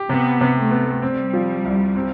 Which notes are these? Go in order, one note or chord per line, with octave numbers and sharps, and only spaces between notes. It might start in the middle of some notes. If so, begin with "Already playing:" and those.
Already playing: G4
C3 B3
C3
A3
B3
G3 C4
F3
C2
C4